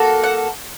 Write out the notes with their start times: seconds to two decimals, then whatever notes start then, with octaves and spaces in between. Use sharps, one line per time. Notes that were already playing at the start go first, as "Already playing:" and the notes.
Already playing: A#3 F#4 A4
0.23 F#5